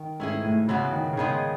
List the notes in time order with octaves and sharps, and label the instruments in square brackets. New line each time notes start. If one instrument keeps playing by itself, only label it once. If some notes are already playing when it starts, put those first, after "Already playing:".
Already playing: [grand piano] D#3
[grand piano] G#2 [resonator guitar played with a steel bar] A3 C#4 E4 G#4
[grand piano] A2
[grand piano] C#3 [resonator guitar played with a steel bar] E3 G#3 B3 F#4
[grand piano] D#3
C#3
[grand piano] D#3 [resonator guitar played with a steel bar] G#3 B3 D#4 G#4